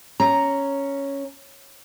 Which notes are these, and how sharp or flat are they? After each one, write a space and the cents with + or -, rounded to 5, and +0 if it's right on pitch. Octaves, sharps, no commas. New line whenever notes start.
C#4 +0 A#5 +0